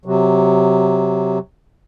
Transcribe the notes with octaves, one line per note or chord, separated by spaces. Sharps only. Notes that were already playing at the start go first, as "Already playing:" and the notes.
C3 F#3